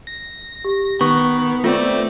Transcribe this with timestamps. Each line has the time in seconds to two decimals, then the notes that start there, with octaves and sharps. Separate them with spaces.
0.07 A#6
0.65 G4
1.01 D#3 B3 C#6
1.64 A3 C4 F4 D5